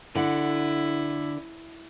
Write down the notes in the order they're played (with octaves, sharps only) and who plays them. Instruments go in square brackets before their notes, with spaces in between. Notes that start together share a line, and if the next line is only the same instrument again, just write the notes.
[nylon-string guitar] D3 F#5 [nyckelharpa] E4